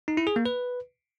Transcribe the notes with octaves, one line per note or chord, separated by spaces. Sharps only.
D#4
E4
G#4
A#3
B4